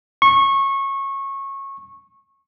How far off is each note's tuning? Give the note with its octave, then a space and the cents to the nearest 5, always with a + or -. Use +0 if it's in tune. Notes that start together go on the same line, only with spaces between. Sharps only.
C#6 -20